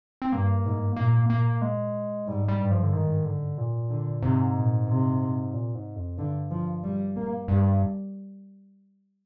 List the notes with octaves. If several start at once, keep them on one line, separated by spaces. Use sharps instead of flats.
C4
G2 A#3
G#2
A#2 A#3
A#3
G#3
G#2 G3
G3
G2
F3
D3
G#2 D#3
D3
A#2
D3
G#2 C3
A#2
C3
A#2
G#2
F2
G2 D3
F3
G3
A#3
G2 G3